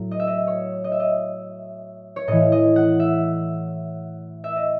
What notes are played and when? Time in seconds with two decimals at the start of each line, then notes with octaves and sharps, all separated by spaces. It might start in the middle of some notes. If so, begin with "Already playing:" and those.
Already playing: A2 F#3
0.11 D#5
0.20 E5
0.27 D#5
0.47 C#5
0.84 D#5
0.92 E5
1.00 D#5
2.16 C#5
2.28 A2 E3 D#5
2.52 D#5
2.76 F#5
3.00 E5
4.44 E5
4.56 D#5